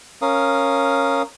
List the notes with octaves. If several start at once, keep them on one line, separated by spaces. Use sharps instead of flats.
C#4 A#4 F5 D#6